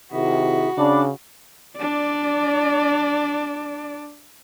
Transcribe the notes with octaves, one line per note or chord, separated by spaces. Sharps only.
C3 D#3 E4 F#4 G#4 E5
C#3 D4 B5 D6
D4 D5